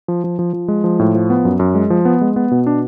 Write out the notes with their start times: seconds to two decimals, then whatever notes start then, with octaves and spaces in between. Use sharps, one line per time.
0.08 F3
0.24 F3
0.39 F3
0.53 F3
0.68 G#3
0.84 F3
0.99 A2
1.15 F3
1.30 B3
1.45 F#2
1.59 F#2
1.75 G#3
1.90 F3
2.05 B3
2.21 G#3
2.36 B3
2.51 B2
2.67 D4